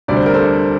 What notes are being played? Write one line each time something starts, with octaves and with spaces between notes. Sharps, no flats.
D2 C3 G3 D4 D5
C5
A#4
A4 C5